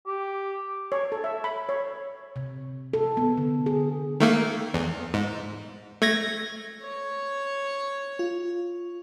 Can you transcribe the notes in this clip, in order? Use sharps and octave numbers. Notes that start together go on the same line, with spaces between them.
G4
C#5
A4
E5
B5
C#5
C3
A4
B3
D3
G#4
D#3 A3 A#3
E2
G#2
A3 G#6 A#6
C#5
F4